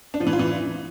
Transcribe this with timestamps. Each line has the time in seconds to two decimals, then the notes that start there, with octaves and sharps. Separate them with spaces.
0.14 D4
0.20 F3
0.27 E3
0.33 F4
0.39 E3